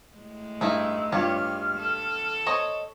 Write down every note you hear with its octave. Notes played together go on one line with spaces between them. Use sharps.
A2 G#3
G2 A3 D#4 E4 E6
G2 F4 G4 C#5 F6
A4
C5 C#5 D#5 C#6